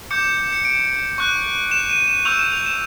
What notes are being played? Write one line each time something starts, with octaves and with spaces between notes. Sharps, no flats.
D6 G6 C#7
C#7
D7
C#6 F#6
E7
D#7
E7
C#6 E6 G6 F7
E7
F7
E7